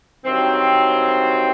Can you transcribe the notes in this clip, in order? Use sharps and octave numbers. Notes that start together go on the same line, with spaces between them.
G2 D#3 F#3 C4